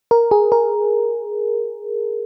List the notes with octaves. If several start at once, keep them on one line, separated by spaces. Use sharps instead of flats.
A#4
G#4
A#4